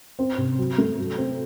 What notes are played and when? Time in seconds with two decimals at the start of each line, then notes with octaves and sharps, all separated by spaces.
0.19 C4
0.38 C3
0.58 F#3
0.78 A3
0.99 F#3
1.18 C4